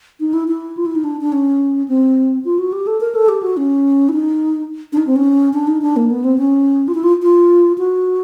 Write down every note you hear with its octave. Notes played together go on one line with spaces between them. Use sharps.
D#4
E4
E4
F4
E4
D#4
D4
D4
C#4
C4
F4
F#4
G4
A4
A#4
A4
G4
F#4
C#4
E4
D#4
D4
D#4
C4
C#4
D4
D#4
D4
A#3
B3
C4
C#4
F4
E4
F4
F4
F#4